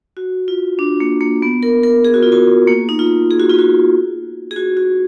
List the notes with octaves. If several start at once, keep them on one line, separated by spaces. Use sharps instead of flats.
F#4
F4
D4
A#3
A#3
B3
A#4
A#4
G#4
F#4
F4
F#4
A#3
D#4
F4
G#4
F#4
F4
F#4
G#4
F#4
F#4